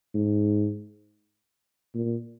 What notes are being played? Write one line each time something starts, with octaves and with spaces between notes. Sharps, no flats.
G#2
A#2